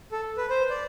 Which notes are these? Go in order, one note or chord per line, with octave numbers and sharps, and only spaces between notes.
A4
B4
C5
D5